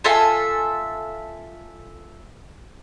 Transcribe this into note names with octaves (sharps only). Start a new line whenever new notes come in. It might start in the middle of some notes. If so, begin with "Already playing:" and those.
F4 A4 E5 G#5